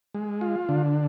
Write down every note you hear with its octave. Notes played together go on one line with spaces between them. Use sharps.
G#3
F4
D3